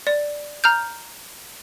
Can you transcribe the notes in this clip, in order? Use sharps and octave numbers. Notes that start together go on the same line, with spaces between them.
D5
A#5 F6 G6